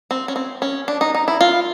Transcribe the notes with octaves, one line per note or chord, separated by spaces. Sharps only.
C4
C#4
C4
C#4
D4
D#4
D#4
E4
F4